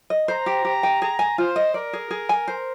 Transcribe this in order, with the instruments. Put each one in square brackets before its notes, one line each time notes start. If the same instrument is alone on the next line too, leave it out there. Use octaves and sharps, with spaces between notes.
[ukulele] D#5
[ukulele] C5 [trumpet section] A#5
[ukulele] G4
G4
G5
[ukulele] G#4 [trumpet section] A#5
[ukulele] G#5
[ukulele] F4 [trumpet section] C5
[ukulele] D#5
[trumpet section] A#4 [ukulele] D5
[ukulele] G#4
G#4
G#5
C5